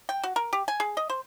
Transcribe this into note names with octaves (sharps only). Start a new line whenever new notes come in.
G5
F#4
A#4
G4
G#5
G#4
D#5
C5